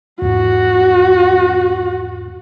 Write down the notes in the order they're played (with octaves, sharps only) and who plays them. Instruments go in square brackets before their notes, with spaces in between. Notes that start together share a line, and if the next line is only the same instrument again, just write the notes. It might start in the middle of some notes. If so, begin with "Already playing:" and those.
[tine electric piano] E2 G#2 [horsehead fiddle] F#4